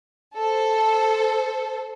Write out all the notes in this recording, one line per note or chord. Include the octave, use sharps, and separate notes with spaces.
A4 C5